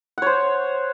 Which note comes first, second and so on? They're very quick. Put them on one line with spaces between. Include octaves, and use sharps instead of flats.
F#5 C#5 C5